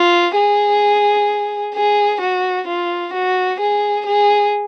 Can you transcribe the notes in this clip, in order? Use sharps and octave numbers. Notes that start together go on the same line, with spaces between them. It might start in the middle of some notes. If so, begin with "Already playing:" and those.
Already playing: F4
G#4
G#4
F#4
F4
F#4
G#4
G#4